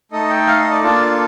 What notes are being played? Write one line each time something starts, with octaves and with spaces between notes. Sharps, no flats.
A3 D#4 A4 D#5
G5
F5
D#5
D5
A#3 D4 F4 A4